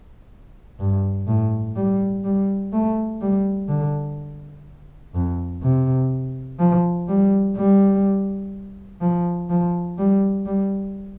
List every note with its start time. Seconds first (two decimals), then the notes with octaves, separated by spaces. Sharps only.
0.79 G2
1.27 A2
1.76 G3
2.24 G3
2.73 A3
3.21 G3
3.68 D3
5.14 F2
5.62 C3
6.59 F3
7.08 G3
7.57 G3
9.01 F3
9.50 F3
9.98 G3
10.46 G3